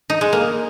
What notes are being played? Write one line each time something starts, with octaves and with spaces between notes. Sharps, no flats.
D#4
G#3
A#3